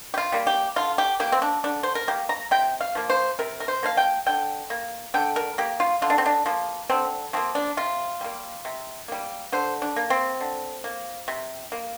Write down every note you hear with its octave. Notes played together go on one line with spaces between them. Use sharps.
G4
F4
G3 A#3
G4
D3 F4
G4
A#3 G4
C4
D4
D3 D4
C5
A#4
A#3 G4
A#5
C3 G5
F5
F3 A#3
C5
C3 A#4
A#4
C5
F3 A#3 F5
G5
D3 G5
A#3
D3 G5
A#4
A#3 G4
F4
D3 F4
D4
C4
D4
F3 A#3
D3 C4
F3 A#3 C4
D4
C3 F4
G3 A#3
C3
G3 A#3
D3 C5
D4
A#3
C4
D3
A#3
C3
A#3